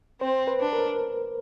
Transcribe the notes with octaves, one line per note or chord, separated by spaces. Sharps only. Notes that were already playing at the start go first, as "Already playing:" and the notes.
C4 C5
B4
D4
A#4